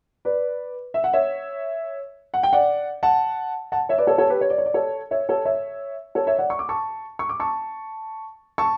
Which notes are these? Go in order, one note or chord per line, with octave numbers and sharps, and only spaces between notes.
B4 D5
E5
F#5
C#5 E5
F#5
G5
D5 F#5
F#5 A5
F#5 A5
C#5 E5
B4 D5
A4 C#5
A4 C#5
G4 B4
C#5
D5
C#5
D5
A4 C#5
C#5 E5
A4 C#5
C#5 E5
A4 C#5
C#5 E5
D5 F#5
C#6
D6
A5 C#6
C#6
D6
A5 C#6
A5 C#6